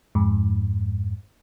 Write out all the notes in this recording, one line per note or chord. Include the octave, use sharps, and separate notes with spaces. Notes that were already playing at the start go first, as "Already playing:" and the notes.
F2 G#2